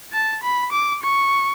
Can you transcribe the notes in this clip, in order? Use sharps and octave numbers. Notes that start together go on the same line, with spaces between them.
A5
B5
D6
C#6